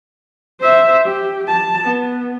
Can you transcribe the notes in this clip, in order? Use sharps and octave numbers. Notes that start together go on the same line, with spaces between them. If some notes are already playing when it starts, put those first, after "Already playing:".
C5 E5
G4
A5
B3